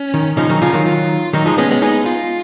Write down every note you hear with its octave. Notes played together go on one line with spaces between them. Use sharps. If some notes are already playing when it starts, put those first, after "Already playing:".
Already playing: C#4
D#3
C#3 F3 D#4
D#3 F#3
C#3 F3 F4
D#3 F#3
F4
D#3 F#3 D#4
F3 G#3
G#3 B3 C#4
G#3 B3
G#3 B3 D#4
F4